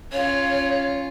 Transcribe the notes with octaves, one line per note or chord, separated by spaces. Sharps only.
C#4 F4 C#5